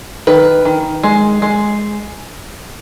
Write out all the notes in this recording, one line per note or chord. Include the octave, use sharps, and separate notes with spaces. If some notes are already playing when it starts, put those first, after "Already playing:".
D#3 B4
D#3
G#3
G#3